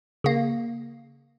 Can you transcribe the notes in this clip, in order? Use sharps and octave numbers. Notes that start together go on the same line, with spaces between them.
C#3 A#3